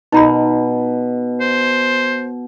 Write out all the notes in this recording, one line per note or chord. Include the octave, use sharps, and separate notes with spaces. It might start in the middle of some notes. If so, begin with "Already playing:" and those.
B2 D#4 A#5 B5
C5